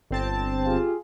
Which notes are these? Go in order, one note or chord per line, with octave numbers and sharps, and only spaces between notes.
G1 C4 A5
F4 G4 G#4